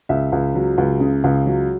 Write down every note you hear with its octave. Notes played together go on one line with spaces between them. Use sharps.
C#2 E5
C#2
F#3
C#2
C#3
C#2
F#3